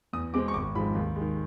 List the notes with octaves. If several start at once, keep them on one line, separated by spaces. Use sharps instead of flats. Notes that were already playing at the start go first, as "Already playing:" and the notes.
E2 D#6
B2 G#3 C4 D6
C#6
G#1 D6
G#2 F3 G#3 B5
D#2
G#3
D#3